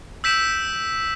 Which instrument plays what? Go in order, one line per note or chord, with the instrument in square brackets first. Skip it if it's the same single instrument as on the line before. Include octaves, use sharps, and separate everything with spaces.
[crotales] E6 G6 B6 D7 E7